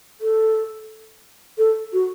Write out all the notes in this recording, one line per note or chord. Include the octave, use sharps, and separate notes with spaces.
A4
A4
F#4